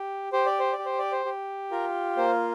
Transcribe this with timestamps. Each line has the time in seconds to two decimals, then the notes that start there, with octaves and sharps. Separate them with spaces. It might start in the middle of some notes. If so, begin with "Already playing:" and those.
Already playing: G4
0.33 G4 C5
0.46 D5
0.59 C5
0.73 D5
0.79 G4
0.86 C5
0.99 D5
1.12 C5
1.25 G4
1.71 F4 A#4
2.17 A#3 C5